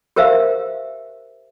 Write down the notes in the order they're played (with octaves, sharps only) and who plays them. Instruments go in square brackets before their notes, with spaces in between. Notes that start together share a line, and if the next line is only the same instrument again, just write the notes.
[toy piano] G4 A#4 C5 E5 F5